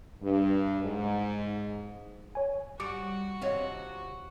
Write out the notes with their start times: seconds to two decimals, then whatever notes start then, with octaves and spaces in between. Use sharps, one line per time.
0.22 G2
0.84 G#2
2.35 C#5 G#5
2.80 G3 F#4 D6 C#7 D7
3.41 D#2 C3 C4 F4 C#5 D#5